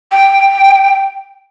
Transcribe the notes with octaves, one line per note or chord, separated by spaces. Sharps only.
G5